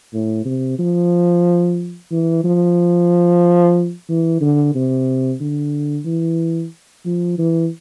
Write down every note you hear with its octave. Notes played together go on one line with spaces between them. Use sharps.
A2
C3
F3
E3
F3
E3
D3
C3
D3
E3
F3
E3